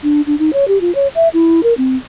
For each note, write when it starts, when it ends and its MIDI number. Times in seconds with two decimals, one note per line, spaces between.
0.03 0.21 62
0.27 0.38 62
0.39 0.53 63
0.53 0.67 73
0.68 0.78 67
0.81 0.94 65
0.95 1.07 73
1.15 1.28 76
1.33 1.63 64
1.63 1.73 70
1.77 1.96 60